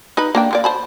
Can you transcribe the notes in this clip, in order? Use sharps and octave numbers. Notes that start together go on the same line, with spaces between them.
D#4 B4 B5
A#3 D4 G5
D3 A#3 D5
C5 A5 B5